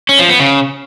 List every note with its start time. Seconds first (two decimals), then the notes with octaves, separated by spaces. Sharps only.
0.09 C#4
0.19 F3
0.29 B3
0.40 C#3